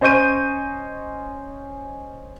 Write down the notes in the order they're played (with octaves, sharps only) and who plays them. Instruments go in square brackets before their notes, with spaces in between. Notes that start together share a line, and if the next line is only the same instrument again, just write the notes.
[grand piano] C#4 C5 D#5 C#6 G6 D#7